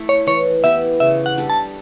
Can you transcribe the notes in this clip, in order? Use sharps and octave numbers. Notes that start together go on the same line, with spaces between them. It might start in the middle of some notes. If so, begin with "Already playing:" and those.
Already playing: A3 E4 A4
C#5
E3 C#5
B3 E4 G4 E5
C#3 E5
F#5
G3 D4 A4
A5